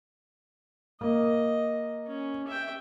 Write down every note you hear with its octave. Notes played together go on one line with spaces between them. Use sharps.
A#3 D#5
C#4
E5 G5